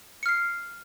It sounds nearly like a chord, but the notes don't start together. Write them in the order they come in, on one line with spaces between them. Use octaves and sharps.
C#7 F6 C7